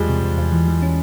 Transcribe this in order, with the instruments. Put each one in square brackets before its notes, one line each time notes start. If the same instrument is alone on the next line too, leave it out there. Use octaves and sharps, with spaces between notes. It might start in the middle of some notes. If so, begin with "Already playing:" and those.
Already playing: [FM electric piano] E2 [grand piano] F3 G3 G#3
[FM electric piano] C3
E2
E2
E3
E3
C#4